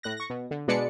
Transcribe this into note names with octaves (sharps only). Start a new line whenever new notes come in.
A2 F#6 A#6
C#6 A#6
B2
D3
B2 G#3 D4 B4 D5 C#7